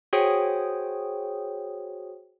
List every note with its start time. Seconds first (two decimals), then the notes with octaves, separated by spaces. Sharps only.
0.13 F#4 G#4 C5 C#5 G5 D#6